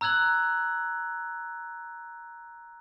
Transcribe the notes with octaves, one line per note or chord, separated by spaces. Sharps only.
A#5 E6 F#6 G#6 F#7